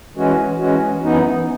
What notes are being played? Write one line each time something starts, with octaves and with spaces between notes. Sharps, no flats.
E3 G#3 C#4 F#4
E3 G#3 C#4 F#4
F#2 E3 B3 D#4